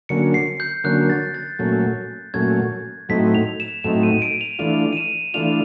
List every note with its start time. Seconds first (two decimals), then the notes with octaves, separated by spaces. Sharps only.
0.09 D3 F#3 A#3 C#4 C#7
0.34 C7
0.60 G6
0.84 D3 F#3 A#3 C#4 F#6
1.10 A6
1.35 A6
1.59 A#2 F#3 A3 C#4
2.34 A#2 F#3 A3 C#4 G#6
3.09 A2 F#3 A3 C4 D#4 B6
3.35 F7
3.60 E7
3.84 A2 F#3 A3 C4 D#4 E7
4.03 D#7
4.22 D7
4.41 F7
4.59 E3 A3 D4 F4 F7
4.92 D#7
4.97 E7
5.34 E3 A3 D4 F4 F7